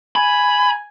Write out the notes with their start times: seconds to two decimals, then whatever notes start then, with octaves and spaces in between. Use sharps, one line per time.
0.16 G#5 B5